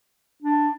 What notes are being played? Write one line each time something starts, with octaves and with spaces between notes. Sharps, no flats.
D4